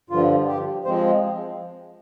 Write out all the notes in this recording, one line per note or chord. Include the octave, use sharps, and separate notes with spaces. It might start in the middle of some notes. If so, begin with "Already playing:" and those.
G2 D3 F3 F4
G4
F3 G#3 C4 C5